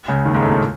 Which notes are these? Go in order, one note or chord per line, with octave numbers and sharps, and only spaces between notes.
C#2 C#3
D#2 D#3
G#2 G#3
A2 A3
A#2 A#3